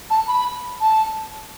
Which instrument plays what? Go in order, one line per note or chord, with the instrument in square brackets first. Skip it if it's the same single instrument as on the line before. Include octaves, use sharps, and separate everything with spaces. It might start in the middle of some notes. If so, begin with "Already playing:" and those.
[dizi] A5
B5
A5